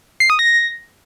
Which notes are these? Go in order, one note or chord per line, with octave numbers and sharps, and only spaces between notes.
C7
D#6
A#6